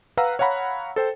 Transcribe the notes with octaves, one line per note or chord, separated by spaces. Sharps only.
B4 F5 F#5 A#5 E6
C#5 F5 F#5 A#5 B5
A4 C5 G5